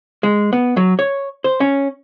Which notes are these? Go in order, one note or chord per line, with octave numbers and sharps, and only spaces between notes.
G#3
B3
F#3
C#5
C5
C#4